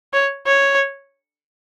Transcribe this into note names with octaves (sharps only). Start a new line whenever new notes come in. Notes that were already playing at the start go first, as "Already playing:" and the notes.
C#5
C#5